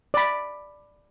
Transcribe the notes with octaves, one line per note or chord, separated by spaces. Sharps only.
D5 B5